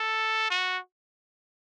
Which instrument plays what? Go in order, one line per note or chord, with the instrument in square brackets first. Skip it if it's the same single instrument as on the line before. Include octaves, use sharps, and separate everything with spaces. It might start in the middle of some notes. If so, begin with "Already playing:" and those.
Already playing: [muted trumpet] A4
F#4